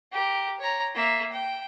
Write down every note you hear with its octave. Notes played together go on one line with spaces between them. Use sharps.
G4 A#4
C#5 A#5
A#3 E5
G5